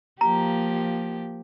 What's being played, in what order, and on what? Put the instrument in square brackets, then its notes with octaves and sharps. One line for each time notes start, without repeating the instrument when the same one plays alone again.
[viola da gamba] F3 A#3 G4 [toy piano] A#5